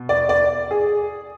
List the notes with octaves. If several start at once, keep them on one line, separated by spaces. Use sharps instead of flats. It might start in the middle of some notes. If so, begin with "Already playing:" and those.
Already playing: B2
D5
D5
G#4